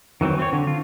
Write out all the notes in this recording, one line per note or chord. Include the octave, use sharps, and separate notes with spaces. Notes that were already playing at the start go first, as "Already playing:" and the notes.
D#3 E3 F#3 C4
C4 C#5
D3
F4